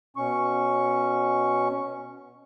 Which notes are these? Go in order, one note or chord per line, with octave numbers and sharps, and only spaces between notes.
B2 C#4 C#6